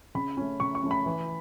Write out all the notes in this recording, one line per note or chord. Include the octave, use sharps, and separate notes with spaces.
C#3 B5
A3 C#4
C#3 C#6
C#6
A3 C#4
B5
E3